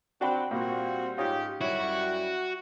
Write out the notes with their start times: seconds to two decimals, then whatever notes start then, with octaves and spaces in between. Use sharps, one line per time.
0.21 C4 D4 F#4 G5 B5
0.51 A#2 G3 A#3 C4 F#4
1.18 G#2 C#4 D#4 F4 G4
1.61 F#2 G3 E4 F#4 C#5